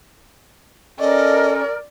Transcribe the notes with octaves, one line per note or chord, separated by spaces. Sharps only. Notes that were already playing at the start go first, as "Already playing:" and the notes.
C#4 A4 A#4 D5 D#5